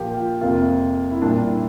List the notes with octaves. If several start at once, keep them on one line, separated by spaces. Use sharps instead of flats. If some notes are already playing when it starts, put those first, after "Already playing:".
Already playing: A#2 F3 A#3 G4
F4
F2 C3 F3 A#3 F4
E4
A#2 G3 A#3 D4
E4